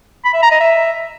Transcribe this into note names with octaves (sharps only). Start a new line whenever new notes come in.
B5
E5
A#5
D#5
E5